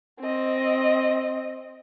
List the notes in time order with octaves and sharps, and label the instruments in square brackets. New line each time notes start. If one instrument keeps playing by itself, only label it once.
[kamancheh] C4 D#5